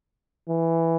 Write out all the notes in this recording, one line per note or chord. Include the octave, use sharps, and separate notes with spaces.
E3